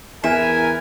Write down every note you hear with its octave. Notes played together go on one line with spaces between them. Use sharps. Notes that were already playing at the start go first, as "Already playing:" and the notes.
E2 E3 A#4 E5 G#5